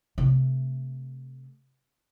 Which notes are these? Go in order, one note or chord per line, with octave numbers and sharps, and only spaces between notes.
C3 A3